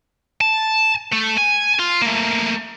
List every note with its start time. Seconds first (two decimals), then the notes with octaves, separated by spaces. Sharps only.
0.41 A5
1.13 A3
1.38 G#5
1.79 F4
2.02 A3 A#3